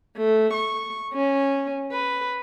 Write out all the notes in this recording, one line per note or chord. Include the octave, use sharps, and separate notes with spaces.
A3
C#6
C#4
B4